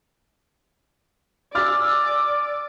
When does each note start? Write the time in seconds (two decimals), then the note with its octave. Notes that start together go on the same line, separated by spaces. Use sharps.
1.55 D5 G#5 D6 E6 F6 A6